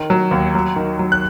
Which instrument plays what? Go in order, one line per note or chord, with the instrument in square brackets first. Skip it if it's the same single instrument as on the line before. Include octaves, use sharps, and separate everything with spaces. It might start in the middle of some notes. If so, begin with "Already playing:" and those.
Already playing: [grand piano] D#3
F#3
D#2
F#3
D#3
F#3
F#6